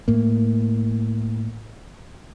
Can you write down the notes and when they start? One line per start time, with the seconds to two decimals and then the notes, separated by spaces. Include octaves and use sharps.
0.08 A2 A#3